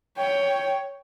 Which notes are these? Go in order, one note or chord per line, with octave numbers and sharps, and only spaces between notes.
C#5 G5